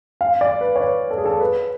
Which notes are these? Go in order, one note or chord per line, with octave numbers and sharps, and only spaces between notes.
F5
D5
B4
C#5
B4
A4
G#4
A4
B4